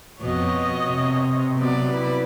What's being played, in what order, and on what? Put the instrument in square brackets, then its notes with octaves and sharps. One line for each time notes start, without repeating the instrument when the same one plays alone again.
[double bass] F2 [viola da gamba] B2 [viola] C#5 D#5
[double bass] C3
[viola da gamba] F#3 D5 [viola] B3
[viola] E4 B4